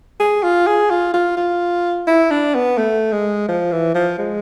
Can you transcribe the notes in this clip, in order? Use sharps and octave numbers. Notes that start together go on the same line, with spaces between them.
G#4
F4
G#4
F4
F4
F4
E4
D4
B3
A3
G#3
F3
E3
F3
G#3